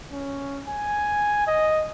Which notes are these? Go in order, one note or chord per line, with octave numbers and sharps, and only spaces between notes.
C#4
G#5
D#5